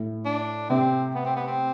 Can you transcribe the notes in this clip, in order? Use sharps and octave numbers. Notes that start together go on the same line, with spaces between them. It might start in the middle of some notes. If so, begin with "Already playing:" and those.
Already playing: A2
D4
C3 C4
B3
C4
B3
C4